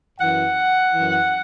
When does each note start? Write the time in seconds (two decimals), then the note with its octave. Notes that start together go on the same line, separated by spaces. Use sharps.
0.19 F#2 E3 F#5
0.93 F#2 E3